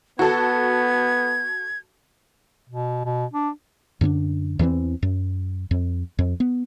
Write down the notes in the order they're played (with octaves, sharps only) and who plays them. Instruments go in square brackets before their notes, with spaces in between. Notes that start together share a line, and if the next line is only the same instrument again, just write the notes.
[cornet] B3 [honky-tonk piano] F#4 A4 [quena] G#6
[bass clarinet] B2
B2
D4
[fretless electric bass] F#2 D3 C4 D4
E2 E3 F3 C4
F#2
F2
F2
B3